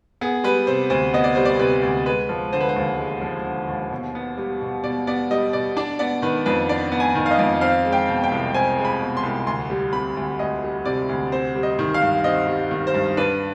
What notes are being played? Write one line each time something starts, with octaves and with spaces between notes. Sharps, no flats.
B3 G#4
G3 B4
C3 C5
D2 C5
B3 D#5
D5
G3 C5
D5
C3 B4
D2
G#3 B4
F3
D3 C5
B4
C5
D#2
G#3
F3
D3
D#2
B2
B3
G3
B2
B2 D5
B3 D5
G3 D#5
B2 D5
D4 D5
B3 D5
D#3 B4
F2 B4
D4 D5
B3
G#5
D#3
F5
D#5
F2
C4 F5
G#3
G5
B2
G5
C2
C4 G#5
G#3
B5
B2
C6
C2
D2 C6
G3
C3 B5
D2
D2 D#5
G3
C3 D5
D2
C4 C5
G3
D#5
D#3
F5
G2
C4 D#5
G3
D#3
C5
G2
D4 B4